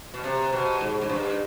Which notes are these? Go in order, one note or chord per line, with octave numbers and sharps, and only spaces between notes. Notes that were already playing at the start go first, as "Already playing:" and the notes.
B2
C3
B2
G#2
G#2
G2